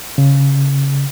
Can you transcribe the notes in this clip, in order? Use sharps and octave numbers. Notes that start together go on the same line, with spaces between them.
C#3